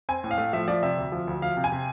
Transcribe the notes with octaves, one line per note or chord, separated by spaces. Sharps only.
C4 G#5
A2
F5
A3
F3 E5
F3 D5
C3 E5
D2
F3
D2
F3 F5
C3
G#5
C3